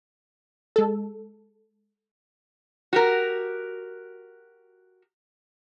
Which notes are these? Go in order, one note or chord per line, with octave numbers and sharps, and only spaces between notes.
G#3 A4
F#4 G4 A#4